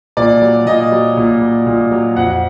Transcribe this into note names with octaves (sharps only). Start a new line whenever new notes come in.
A#2 D5
F#3
A#2 D#5
F#3
A#2
F#3
A#2
F#3
F2 F#5